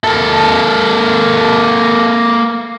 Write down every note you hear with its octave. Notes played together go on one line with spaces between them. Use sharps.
A#3 A4